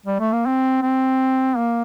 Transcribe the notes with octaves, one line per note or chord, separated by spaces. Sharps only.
G3
A3
A#3
C4
C4
A#3